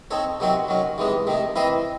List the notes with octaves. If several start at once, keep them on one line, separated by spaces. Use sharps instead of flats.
C4 D#4 A4 C#5
C3 D#3 F#3 C4 F#4
D#3 F#3 C#4
C3 E3 G#3 D#4
C3 D#3 A3 D#4
E3 C4 E4 C5 D#5